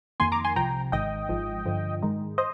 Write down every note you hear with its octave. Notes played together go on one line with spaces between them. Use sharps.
F2 D#3 A#3 G#5 C6
A#5 D6
G#5 C6
C2 C3 F3 G5 A#5
G#1 G#2 D#3 D#5 G5
G#1 G#2 F3
G2 D3 F3
G#2 D#3 G#3 D#4
C5 D#5